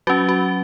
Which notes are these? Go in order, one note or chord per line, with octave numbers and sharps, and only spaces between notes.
F#3 C#4 F#4
F#4